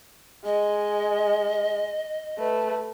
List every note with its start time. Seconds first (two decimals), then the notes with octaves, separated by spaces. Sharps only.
0.45 G#3 D#5
2.39 A3 B4